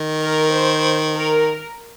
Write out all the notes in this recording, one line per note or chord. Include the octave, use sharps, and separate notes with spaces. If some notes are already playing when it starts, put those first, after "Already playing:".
Already playing: D#3
A#4
C5
A#4